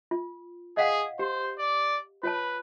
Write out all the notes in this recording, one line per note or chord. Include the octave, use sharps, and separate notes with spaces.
F4
G#4 D#5 F5 F#5
G4 C5
D5
F4 B4 C#5 A5